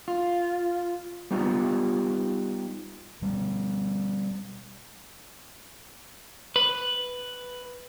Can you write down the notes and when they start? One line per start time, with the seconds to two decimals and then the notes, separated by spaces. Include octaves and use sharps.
0.08 F4
1.31 G3 B3 D#4 F4 G4
3.22 B2 G3 B3
6.56 B4